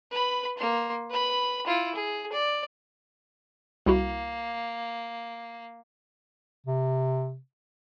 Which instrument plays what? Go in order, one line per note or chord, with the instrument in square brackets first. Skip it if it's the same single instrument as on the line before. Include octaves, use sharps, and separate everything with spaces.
[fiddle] B4 B5
A#3 C6
B4 B5
E4 F4
G#4
D5
[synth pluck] C2 E4 F#4 [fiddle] A#3
[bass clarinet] C3